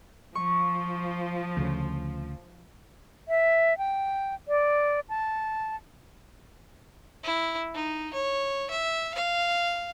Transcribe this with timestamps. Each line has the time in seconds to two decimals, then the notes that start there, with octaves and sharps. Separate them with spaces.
0.35 F3 C#6
1.57 D2 C#3
3.28 E5
3.78 G5
4.48 D5
5.09 A5
7.23 E4
7.74 D#4
8.13 C#5
8.70 E5
9.14 F5